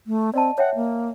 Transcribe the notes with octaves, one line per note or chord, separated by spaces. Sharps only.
A3
C4 D5 D#5 A5
C#5 E5 F#5 G5
A#3